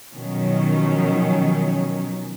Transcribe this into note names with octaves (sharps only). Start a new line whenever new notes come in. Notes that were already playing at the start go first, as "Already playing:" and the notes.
B2 D#3 F3 F#3 C#4